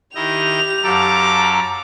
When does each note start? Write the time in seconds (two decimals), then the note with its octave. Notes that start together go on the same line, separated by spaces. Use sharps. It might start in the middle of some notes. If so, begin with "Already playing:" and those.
0.15 D#3 E4 G4 D#5 F7
0.83 F#2 A4 F5 A5 A#5 D6